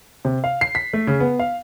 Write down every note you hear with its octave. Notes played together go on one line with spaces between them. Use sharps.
C3
F5
C7
B6
A3
C#3
B3
F5